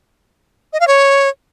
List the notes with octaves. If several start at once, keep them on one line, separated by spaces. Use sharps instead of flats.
D#5
F5
C#5